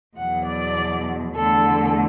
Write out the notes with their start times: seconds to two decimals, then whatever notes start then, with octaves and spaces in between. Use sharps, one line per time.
0.17 E2 B2 F#3 F#5
0.47 D5
1.36 E2 D3 A3 A4